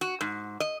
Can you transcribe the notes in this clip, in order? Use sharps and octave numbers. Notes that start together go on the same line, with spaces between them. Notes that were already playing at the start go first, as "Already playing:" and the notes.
F#4
G#2
D#5